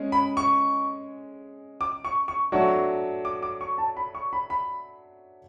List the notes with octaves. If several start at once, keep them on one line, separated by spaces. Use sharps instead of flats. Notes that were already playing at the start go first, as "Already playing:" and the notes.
Already playing: G#3 C#4 G#4
B5
C#6
D6
C#6
C#6
F#3 A3 D4 F#4 C#5 C#6
D6
D6
C#6
A5
B5
C#6
B5
B5